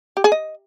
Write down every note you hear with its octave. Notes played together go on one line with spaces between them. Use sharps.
G4
G#4
D#5